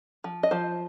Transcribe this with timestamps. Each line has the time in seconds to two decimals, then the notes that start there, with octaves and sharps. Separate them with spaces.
0.24 F3
0.43 D#5
0.51 F3 C5